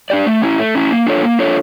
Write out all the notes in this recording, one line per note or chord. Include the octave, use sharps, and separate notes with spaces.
D4 G4 D5
A3
C#4 E4
A3
C#4 E4
A#3
D4 F4 A4 C#5
A#3
D4 F4 A4 C#5